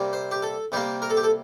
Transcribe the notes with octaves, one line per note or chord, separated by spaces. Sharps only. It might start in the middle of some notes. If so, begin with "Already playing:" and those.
Already playing: C3 G3 A#3
C5
G4
A4
C3 G3 A#3 G4
A#4
A4
G4
A4